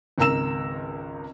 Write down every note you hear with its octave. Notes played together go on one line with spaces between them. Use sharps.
G#1 C#2 A#4 A#5 E6 E7